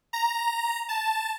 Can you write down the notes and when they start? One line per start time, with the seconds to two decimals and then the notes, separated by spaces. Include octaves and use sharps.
0.13 A#5
0.89 A5